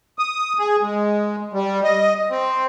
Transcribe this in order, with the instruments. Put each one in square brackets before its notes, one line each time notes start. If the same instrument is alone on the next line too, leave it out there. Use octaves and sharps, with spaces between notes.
[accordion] D#6
G#4
G#3
G3
D#5
C4